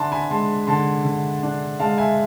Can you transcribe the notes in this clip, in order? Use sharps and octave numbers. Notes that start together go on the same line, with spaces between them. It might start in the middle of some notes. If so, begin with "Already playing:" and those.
Already playing: D3 D4 E5 G#5 A5 B5 C6
G#5 B5
G#3 A5 C6
D3 A5 C6
D3
D4
G#3 F5 A5
E5 G#5